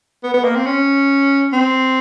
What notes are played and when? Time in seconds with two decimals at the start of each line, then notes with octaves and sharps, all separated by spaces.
0.24 B3
0.34 B3
0.44 A#3
0.55 C4
0.66 C#4
1.53 C4